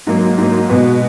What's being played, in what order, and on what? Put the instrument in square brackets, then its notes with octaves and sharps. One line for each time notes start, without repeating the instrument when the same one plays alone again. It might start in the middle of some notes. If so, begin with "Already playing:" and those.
[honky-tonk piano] G#2 F#3 A#3
G#2 F#3 A#3
B2 G#3 B3 F#4